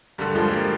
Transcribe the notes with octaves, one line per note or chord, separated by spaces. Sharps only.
G2 D3 G3
F3 G#3
G3 A#3